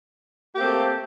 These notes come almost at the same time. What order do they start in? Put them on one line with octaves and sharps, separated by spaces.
G4 A#3 C4 A3